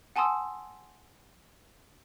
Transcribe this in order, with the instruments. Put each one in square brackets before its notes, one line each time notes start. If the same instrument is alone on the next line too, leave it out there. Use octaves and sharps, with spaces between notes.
[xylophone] F#5 G#5 A5 C6 D#6 E6